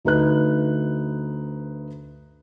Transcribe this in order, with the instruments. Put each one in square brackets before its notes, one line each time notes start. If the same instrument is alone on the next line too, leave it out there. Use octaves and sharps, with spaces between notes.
[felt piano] D2 D#4 B4 F#6